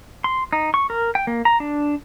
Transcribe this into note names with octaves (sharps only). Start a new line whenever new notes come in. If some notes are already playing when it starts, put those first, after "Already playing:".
C6
D#4
C#6
A#4
G5
A#3
A#5
D4